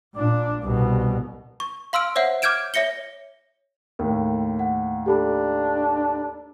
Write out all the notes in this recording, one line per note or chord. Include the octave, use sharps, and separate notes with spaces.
A#2 D4
C2 B2
C#6
F5 C6 E6 F6 D7
C5 C#5 E5 F#5
D6 F6 G6 G#6 D7 E7
C#5 E5 A#6 C#7 G7
D#2 A2 A#4
F#5
D4 G4 A4 B5